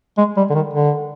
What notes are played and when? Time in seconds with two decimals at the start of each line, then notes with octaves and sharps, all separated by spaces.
0.18 G#3
0.37 G3
0.50 D3
0.55 D#3
0.73 D3